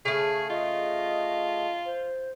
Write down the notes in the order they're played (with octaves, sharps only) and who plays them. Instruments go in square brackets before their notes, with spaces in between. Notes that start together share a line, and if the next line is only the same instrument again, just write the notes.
[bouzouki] C#3 A3 [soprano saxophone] G#4
[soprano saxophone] F4 [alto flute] D#5
[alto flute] C5